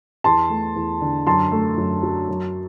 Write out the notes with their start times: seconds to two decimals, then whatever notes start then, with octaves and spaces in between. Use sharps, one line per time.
0.24 E2 A5 C6
0.50 A3
0.76 E2
1.01 D3
1.27 F#2 A5 C6
1.52 A3
1.77 F#2
2.03 F#3
2.29 F#2